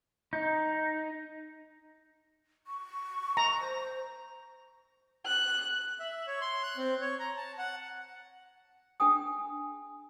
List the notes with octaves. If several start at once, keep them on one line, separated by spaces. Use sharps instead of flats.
D#4
C#6
A#5
C5
F#6
E5
C#5
C6
F#6
C4
C#5
A#5
A5
F#5
D4 G#4 G5 G#5 D#6